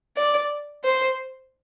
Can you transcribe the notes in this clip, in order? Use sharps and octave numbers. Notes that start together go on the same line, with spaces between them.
D5
C5